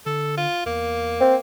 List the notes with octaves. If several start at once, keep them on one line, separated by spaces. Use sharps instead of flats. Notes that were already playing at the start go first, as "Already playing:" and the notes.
D3 A4
F4
E2 A#3
C4